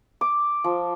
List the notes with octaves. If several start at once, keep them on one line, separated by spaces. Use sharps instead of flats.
D6
F3